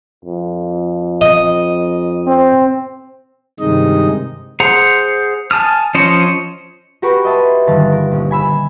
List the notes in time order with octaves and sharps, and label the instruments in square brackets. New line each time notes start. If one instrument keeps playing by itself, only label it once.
[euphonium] F2
[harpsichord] D#5
[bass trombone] C4
[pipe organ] G2 C3 D#3 G#3 D#4 D#5
[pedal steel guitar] G#4 C5 F#5 A#5
G#5 A5 D#6 F6
F3 C#4 C5 C#5 D#5
[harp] F#4 G4 A#4 B4 C#6
D#5 E5 A5 B5 C6
G1 D3 D#3 F5 A5
A#4
A#1
G#5 B5 E6